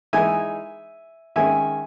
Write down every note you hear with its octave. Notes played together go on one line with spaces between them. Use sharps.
E3 G#3 D#4 E5 G#5
D#3 G#3 C#4 E5 G#5